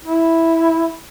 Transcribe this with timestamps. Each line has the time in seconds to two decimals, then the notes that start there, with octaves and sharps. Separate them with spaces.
0.05 E4